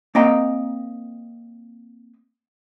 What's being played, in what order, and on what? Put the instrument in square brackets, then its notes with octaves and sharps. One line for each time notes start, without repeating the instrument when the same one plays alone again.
[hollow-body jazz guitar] A#3 C4 D#5 G5 A#5